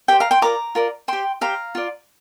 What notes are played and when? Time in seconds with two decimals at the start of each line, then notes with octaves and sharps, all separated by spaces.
0.08 G4 C5 G5
0.20 F5 A#5
0.31 G5 C6
0.42 F4 A#4 D5 A#5 D6
0.75 F4 A#4 D5
1.08 G4 C5 G5 C6
1.41 G4 C5 F5 A#5
1.75 F4 D5